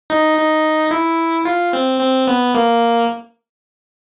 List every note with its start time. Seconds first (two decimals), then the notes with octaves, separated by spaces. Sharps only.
0.10 D#4
0.37 D#4
0.91 E4
1.45 F4
1.73 C4
2.00 C4
2.28 B3
2.55 A#3